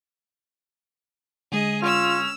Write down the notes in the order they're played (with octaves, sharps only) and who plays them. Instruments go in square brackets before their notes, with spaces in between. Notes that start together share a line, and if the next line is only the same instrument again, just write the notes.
[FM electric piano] D3 G#3 [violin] G#4 D#5
[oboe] C#4 [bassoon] F4 [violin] E6 F7